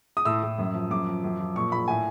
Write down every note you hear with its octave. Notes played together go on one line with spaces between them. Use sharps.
D#6
A2 E6
A2
F#2
F3
F#2 D6
F3
F#2
F3
A#2 C#6
A#2 B5
A2 G#5